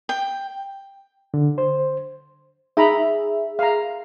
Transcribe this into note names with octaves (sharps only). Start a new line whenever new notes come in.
G5
D3
C5
D#4 G#4 E5 A#5 B5
F5 A#5